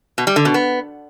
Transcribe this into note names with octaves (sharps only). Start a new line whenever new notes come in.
B2
G3
D3
B2
B3